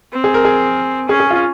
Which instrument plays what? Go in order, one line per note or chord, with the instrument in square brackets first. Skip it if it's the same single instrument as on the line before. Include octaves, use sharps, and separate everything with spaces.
[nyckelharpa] C4
[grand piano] G#4
A#4
G#4
[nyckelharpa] C#4 [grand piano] G#4
[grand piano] G#4
F4